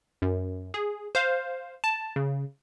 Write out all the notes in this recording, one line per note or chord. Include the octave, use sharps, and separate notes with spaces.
F#2
G#4
C5 F5
A5
C#3